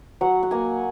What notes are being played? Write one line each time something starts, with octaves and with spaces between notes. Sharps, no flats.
F#3 F#5
F#5
A#3 G#5